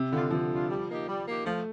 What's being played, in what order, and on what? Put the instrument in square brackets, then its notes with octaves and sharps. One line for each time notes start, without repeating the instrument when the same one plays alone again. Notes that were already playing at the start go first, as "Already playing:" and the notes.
Already playing: [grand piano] C3
[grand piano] D3 [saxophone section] G3 D4 F4
[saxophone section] D3 [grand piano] F3
[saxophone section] G3 D4 F4
G3
A#3 D#4 G4
G3
A#3 D#4 G4
[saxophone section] F3 [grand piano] A3